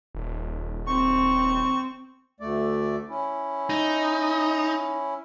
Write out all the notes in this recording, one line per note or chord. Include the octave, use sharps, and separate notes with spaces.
D#1
C4 C#6
D2 A3 D5
C#4 E4
D#4